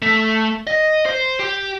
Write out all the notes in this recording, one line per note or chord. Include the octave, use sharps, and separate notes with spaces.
A3
D#5
C5
G4